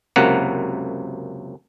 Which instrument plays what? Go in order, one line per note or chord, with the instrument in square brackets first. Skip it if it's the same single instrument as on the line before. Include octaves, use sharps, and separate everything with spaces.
[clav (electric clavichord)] C#2 F#2 C3 A#3 F#5